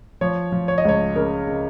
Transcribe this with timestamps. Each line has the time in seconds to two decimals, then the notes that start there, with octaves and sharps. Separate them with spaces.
0.21 F3 C#5
0.52 F3
0.68 C#5
0.78 D#5
0.84 C#2 C#5
1.15 C#3 A#4
1.47 C#3